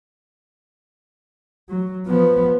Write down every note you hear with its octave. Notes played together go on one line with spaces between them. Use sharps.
F#3
F3 B3